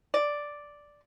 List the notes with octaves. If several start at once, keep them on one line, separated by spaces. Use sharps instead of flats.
D5